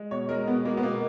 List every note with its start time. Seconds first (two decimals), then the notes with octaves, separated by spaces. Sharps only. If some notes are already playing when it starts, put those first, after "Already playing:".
Already playing: G#3
0.11 B2 C#5
0.29 G#3 A#4
0.47 B2 B3
0.65 G#3 A#3
0.77 B3
0.83 B2 A#3